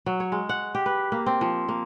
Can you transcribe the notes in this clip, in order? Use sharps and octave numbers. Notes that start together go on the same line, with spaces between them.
F#3
C#5
G#3
F#5
G4
B4
A#3
C4
F3
A#3